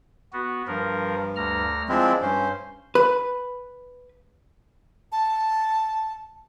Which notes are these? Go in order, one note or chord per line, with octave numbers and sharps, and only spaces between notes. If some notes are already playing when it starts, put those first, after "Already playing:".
B3 F#4
G2 F3 A#4
D2 A#5 F6
F3 G#3 C4 D4 E4
G2 C#4 C5
B4
A5